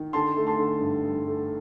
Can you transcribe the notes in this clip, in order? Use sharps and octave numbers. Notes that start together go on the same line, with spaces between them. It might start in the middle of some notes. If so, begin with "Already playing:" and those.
Already playing: D#3
D3 A5 C6
A3
A5 C6
D3
G2
G2
A3